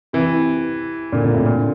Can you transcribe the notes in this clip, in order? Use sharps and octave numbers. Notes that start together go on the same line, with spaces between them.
C3 E3
A#2 D3
A#2 D3
A2 C3
A#2 D3